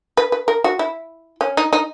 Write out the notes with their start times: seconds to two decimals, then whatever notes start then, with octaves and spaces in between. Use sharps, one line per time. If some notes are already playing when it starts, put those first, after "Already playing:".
0.17 B4
0.32 B4
0.48 A#4
0.64 F#4
0.79 E4
1.41 C#4
1.57 D#4
1.73 D#4